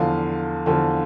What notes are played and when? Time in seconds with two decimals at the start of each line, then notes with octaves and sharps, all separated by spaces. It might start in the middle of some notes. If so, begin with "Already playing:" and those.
Already playing: E2 D3 F3 F5
0.66 E2 D3 F3